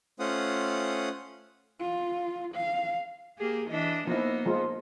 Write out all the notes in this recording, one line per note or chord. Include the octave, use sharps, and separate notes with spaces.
A3 C#4 F4 C5 F#5 D#6
F4
F5
A#3 G4 G#4
E3 D4 D#5
F3 A#3 B3 D#4 E4
F3 G#3 F4